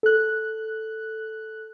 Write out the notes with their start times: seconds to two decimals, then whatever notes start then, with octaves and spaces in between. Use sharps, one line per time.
0.03 A4 F#6